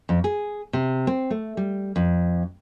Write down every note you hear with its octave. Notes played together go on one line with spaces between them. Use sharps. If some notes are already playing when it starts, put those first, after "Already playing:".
F2
G#4
C3
C4
A3
G3
F2